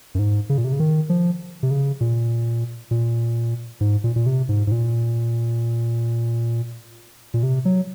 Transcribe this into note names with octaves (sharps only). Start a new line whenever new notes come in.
F#2
G#2
C#3
A#2
C3
C#3
D#3
F3
C3
C#3
A#2
A#2
G#2
A#2
A#2
C3
G#2
G#2
A#2
A#2
C3
F#3